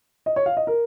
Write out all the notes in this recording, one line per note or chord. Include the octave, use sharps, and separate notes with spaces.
D#5
C#5
F5
D#5
A#4